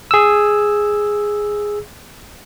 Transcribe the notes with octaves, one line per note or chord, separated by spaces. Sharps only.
G#4 E6